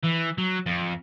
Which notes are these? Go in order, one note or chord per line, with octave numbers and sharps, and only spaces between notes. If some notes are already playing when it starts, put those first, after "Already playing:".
E3
F#3
F2